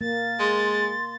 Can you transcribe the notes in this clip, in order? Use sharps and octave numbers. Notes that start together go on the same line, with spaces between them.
A#3 A6
G#3 C6